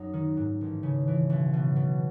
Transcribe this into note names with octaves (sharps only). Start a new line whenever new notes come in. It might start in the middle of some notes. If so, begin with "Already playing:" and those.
Already playing: F#2 D#4
D#3
G#2
A1
C#3
E3
B1
B2
B2